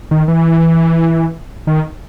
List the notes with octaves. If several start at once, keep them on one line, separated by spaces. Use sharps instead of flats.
D#3
E3
D#3